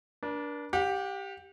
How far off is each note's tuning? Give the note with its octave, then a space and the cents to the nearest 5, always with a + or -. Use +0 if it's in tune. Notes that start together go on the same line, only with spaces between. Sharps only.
D4 -10 A#4 +45
G4 +0 F#5 -40